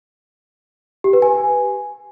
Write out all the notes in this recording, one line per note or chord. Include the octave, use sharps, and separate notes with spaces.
G4
B4
G#5